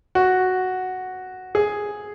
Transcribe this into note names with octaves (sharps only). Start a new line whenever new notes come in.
F#4
G#4